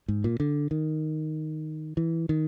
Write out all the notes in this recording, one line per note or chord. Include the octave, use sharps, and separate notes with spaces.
G#2
A#2
D3
D#3
E3
D#3